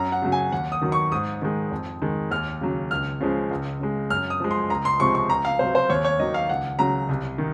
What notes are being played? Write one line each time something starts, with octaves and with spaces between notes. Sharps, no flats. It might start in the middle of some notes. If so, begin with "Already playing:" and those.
Already playing: F#2 A#5
F#5
C#3 F#3
G#5
D#2 F#5
D#6
D#3 F#3
C#6
G#2 D#6
D#3 G#3
F2
D#3 G#3
D#2 F6
C#3 F#3
C#2 F6
C#3 F3 G#3
C#2
C#3 G#3
F#2 F6
D#6
F3 G#3
C6
C#2 A#5
C6
C3 F3 G#3 C#6
C#6
C#2 A#5
F5
C3 F#3 C5
C5
D#2 C#5
C#5
D#3 F#3 D#5
F5
C#2 F#5
C#3 F#3 A#5
C2
D#3